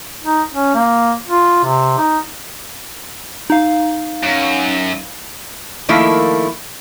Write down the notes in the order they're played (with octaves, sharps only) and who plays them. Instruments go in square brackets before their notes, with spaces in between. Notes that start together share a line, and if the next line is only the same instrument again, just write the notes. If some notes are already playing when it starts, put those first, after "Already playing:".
[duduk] D#4
C#4
A#3
F4
C3
D#4
[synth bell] D#4 F5
[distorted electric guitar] F#2
[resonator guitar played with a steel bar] D#3 F3 A3 A#3 E4